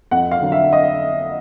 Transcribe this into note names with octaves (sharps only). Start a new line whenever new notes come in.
F2 F#5
F5
D3 F#3
E5
D#5